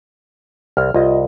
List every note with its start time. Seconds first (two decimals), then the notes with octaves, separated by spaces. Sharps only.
0.77 C2 F6
0.94 C2 F4 D#5